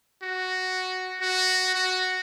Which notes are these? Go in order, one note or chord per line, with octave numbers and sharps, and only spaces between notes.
F#4
F#4
F#4